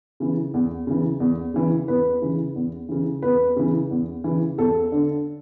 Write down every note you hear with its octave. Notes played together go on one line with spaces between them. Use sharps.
C#3 E3
E2
C#3 E3
E2
C#3 E3
E2 B4
C#3 E3
E2
C#3 E3
E2 B4
C#3 E3
E2
C#3 E3
E2 A4
D3